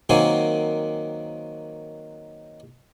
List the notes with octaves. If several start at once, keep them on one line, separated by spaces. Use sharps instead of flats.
D#3 F#3 A#3 C4 G#5